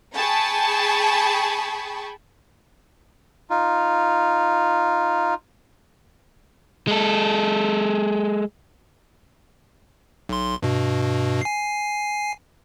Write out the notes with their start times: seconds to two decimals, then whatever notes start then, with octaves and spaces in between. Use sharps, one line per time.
0.15 G#4 G5 A5 B5 C#6
3.50 D#4 F4
6.87 G#3 A4
10.29 B1 C6
10.63 G2 B2
11.41 G#5 C7